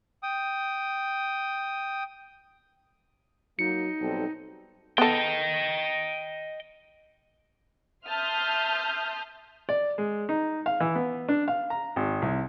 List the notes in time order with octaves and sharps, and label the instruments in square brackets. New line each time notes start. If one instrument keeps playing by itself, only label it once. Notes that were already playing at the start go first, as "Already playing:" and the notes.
[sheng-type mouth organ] G5 D#6
[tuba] F#3 [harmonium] A#3 [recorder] D#4 [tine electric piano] C#7
[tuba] B1 [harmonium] G3 C4 A4
[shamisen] B3 A4 [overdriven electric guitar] D#5 G5
[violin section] E5 A5 C6 D#6 F6 G6
[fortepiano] D5
G#3
D#4
F5
E3
B3
D4
F5
A#5
G#1
C2